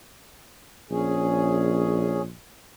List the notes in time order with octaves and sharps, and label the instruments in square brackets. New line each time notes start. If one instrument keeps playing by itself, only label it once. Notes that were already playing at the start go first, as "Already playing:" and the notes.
[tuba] A#1 [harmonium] C#4 G#4